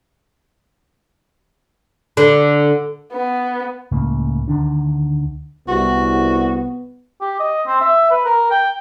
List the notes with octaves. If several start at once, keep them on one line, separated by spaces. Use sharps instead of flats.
D3
B3
C#2 A2 C#3 A#3
D2 D3 D#3 D4
C2 B3 F#4
G4
D#5
C4
E5
B4
A#4
G5